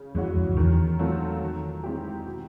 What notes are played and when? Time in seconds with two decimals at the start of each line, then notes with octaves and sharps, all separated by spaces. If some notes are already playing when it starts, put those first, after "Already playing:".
Already playing: C#3
0.15 F2 E3 G#3 C#4 F#4
0.36 F2
0.52 F2
0.56 E2 D#3
0.99 F#3 A3 C4 F4
1.41 D#3
1.83 G#3 C4 E4 G4
2.26 B2